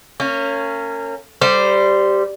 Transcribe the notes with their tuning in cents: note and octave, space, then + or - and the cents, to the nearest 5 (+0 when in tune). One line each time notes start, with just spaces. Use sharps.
A#3 -30 C#4 +0
G3 +0 C5 -15